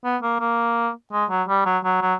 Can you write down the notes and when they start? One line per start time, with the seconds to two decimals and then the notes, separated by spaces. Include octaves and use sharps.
0.04 B3
0.22 A#3
0.40 A#3
1.12 G#3
1.30 F#3
1.48 G3
1.66 F#3
1.84 F#3
2.02 F#3